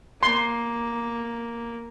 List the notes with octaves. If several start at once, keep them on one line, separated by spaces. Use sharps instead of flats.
A#3 C6